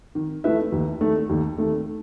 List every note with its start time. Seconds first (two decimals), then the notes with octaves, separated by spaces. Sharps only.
0.15 D#3
0.44 A3 E4 B4 E5
0.72 D#2
1.01 D#3 A3
1.29 D#2
1.58 D#3 A3